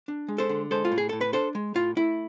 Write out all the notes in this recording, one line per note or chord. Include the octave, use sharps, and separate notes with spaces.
D4
G#3
A4 C5
D3
G#3 A4 C5
F4
A2
G#4
A2 A4
B4
D4 A4 C5
G#3
A2 F4
A3 E4